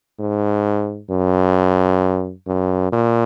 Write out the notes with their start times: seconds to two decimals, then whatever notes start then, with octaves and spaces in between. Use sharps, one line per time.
0.20 G#2
1.11 F#2
2.48 F#2
2.92 A#2